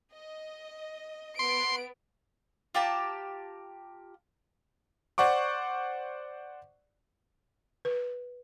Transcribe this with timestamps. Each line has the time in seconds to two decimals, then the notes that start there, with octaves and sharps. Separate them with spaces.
0.13 D#5
1.39 B3 C6 D7
2.74 F4 G4 A5 A#5
5.18 C5 D5 F#5 C#6 D6
7.85 B4